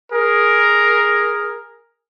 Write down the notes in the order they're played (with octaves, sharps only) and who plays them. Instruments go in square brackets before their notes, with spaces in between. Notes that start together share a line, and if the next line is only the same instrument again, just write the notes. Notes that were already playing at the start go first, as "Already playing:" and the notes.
[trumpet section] G#4 A#4